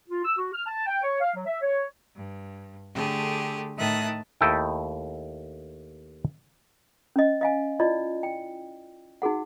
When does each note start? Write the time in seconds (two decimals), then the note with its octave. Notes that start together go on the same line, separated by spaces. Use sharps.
0.09 F4
0.25 E6
0.37 F#4
0.53 F6
0.67 A5
0.86 G5
1.02 C#5
1.21 F5
1.34 F#3
1.46 E5
1.61 C#5
2.15 G2
2.93 D3 A3 G4 G#4
3.77 A2 D#3 E5 A5 D#6 F#6
4.41 D#2 A3 E4 A4 D#5 G5
7.16 C#4 D#5
7.41 D#5 F5 G#5
7.79 E4 F4 D5 D#5
8.23 G5
9.22 D#4 F#4 G#4 F#5